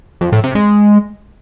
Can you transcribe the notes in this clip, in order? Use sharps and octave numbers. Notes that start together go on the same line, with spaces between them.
F2
A2
C3
G#3